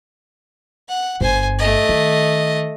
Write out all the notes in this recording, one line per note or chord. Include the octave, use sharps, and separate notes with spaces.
F#5
G1 C5 G#5
A3 D#5
D#3